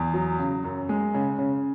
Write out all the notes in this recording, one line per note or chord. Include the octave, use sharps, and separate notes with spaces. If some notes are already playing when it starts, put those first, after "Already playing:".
Already playing: E2
F#3
C#3
F#2
G#3
C#3
C#3